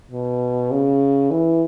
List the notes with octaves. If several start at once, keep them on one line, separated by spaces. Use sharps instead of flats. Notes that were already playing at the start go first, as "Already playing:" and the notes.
B2
C#3
E3